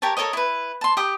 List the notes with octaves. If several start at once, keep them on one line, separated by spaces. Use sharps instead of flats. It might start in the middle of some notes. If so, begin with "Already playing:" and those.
G4 A#4 C#5 A5
A4 A#4 C#5 D#5
E4 B4
A5 C6
G4 G5 D#6